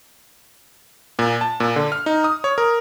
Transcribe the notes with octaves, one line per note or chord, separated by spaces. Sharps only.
A#2
A5
A#2
D3
F6
D#4
D#6
C#5
A#4